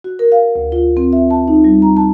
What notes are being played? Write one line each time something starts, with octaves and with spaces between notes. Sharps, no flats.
F#4
A#4
F5
D2
F4
C4
E5
A5
D#4
G3
A#5
A5